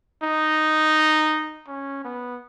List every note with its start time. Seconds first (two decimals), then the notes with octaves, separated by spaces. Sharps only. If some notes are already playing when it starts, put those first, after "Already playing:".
0.23 D#4
1.68 C#4
2.04 B3